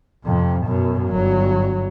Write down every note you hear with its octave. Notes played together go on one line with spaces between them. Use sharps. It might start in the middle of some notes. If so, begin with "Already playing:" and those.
F2 C3
F#2 B2
G1 F#3